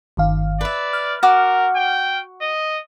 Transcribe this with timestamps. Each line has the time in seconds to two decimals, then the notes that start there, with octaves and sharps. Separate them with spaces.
0.17 G1 D#3 F5
0.61 B4 D5 E5
0.93 F6
1.23 F#4 A#4 F#5 D6
1.76 G5
2.42 D#5